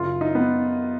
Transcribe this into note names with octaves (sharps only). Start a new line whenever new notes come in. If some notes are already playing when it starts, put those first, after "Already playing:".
Already playing: F#2 C#3 F4
D#4
B3